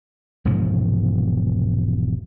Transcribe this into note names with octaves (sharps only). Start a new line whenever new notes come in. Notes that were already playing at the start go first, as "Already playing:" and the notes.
E1 G#2 C3 F3